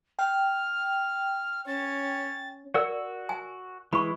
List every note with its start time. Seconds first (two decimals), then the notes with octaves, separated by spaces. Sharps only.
0.19 G5 F6
1.67 C#4 A6
2.74 F#4 A#4 D5 F#5 E6
3.29 G#5
3.93 E3 G#3 E4 B5 C#6